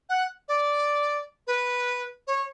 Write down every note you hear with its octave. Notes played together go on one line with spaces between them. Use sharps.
F#5
D5
B4
C#5